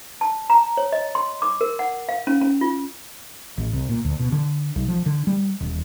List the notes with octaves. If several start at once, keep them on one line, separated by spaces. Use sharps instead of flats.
A5
A#5
C#5
D#5
C6
D6
A#4
F#5
F5
C#4
C#4
F4
A1
C2
A#2
D2
B2
D3
B1
F3
D3
G3
D#1